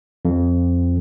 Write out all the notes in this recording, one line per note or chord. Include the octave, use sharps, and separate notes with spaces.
F2